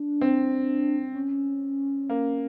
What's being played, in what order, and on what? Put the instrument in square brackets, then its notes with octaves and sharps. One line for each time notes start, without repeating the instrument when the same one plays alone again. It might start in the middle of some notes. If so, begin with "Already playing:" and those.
Already playing: [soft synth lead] D4
[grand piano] C4
[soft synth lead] C#4
[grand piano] A#3